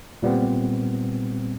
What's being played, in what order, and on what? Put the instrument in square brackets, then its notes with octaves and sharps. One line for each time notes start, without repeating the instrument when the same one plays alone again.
[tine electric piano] A#2 G3 B3 C4